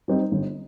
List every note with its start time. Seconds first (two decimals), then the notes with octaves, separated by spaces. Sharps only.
0.08 G3 C4 D#4
0.32 G1